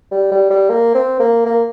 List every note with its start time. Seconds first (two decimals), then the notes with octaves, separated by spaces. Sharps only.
0.11 G3
0.32 G3
0.50 G3
0.70 A#3
0.95 C4
1.20 A#3
1.45 A#3